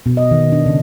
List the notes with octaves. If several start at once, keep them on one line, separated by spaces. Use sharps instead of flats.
B2
D#5
D#3
D4
C#3